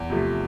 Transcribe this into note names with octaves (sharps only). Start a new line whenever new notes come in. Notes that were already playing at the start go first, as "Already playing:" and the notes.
Already playing: E2
C3 F3 A3